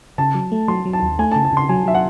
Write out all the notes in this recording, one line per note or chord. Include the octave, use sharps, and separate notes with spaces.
C#3 A5
F#3
A3
F#3 C6
F#3
A5
D#2
A3 G#5
A5
C#3
A5
C#3 C6
F#3 G#5
F#3 E5
F#5